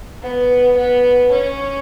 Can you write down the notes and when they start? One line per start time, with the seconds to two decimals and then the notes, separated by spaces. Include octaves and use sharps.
0.22 B3
0.77 B3
1.32 C#4